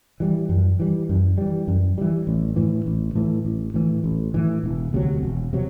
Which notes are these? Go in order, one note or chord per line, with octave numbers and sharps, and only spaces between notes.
E3 G3
F#2
E3 G3
F#2
E3 G3
F#2
E3 G3
A1
A2 E3
A1
A2 E3
A1
A2 E3
A1
A2 E3
E1
D2 C3 F#3
E1
C3 F#3